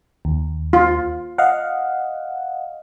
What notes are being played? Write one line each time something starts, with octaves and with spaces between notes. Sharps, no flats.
D#2
F4
D#5 F5 F#5